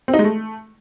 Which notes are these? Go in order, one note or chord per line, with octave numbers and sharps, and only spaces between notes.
C4
D#4
G#3
A3